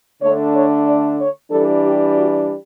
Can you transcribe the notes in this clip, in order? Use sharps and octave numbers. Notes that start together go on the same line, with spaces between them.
D3 A3 D4 C#5
C#5
D5
C#5
E3 G3 D4 A4
G4
F#4